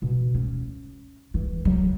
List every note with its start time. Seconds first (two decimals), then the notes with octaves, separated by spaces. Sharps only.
0.02 B2
0.35 C#4
1.34 E3
1.65 F#3